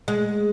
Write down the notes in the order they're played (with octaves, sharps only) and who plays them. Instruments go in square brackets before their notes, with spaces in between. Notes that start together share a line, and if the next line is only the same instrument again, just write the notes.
[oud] G#3